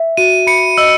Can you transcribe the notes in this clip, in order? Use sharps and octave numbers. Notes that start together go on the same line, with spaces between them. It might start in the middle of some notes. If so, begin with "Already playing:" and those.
Already playing: E5
F#4 D#7
B5 C#7
D#5 E6